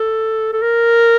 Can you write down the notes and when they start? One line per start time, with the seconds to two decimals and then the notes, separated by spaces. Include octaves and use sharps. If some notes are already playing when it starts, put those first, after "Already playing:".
Already playing: A4
0.53 A4
0.62 A#4